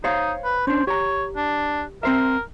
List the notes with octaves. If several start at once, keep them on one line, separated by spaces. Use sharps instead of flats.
D#4 C5 C#5 F5
B4
C#4 D4 C5
G4 C#5 A#5
D4
C4 A#4 C5 E5